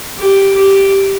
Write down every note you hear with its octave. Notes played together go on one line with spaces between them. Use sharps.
G4
G4